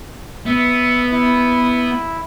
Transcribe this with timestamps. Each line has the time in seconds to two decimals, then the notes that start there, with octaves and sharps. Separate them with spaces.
0.46 B3 E5
1.12 E4